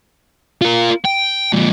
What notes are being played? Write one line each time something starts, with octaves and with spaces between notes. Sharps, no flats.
F4 A#4
G5
F2 A#2